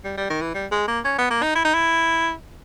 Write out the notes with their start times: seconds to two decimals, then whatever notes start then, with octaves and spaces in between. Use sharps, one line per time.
0.04 G3
0.17 G3
0.30 D#3
0.42 E3
0.54 G3
0.71 G#3
0.88 A#3
1.05 C#4
1.18 B3
1.31 A#3
1.43 D#4
1.55 E4
1.65 D#4
1.74 E4